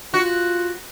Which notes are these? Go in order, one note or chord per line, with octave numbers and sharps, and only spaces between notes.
F4 F#4